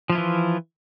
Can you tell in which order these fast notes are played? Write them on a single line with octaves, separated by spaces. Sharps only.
F3 F4 E4 E3